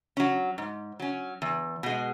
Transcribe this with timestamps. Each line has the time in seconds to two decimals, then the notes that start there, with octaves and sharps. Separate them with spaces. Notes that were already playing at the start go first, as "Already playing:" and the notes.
0.17 F#3 C#4
0.58 G#2
1.00 F#3 C#4
1.42 E2
1.83 B2 G#3